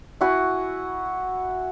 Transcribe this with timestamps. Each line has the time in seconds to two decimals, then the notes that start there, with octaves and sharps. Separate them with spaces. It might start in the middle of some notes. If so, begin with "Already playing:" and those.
0.21 E4 F#4 G#5